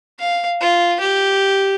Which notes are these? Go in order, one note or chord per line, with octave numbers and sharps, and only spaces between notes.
F5
F4
G4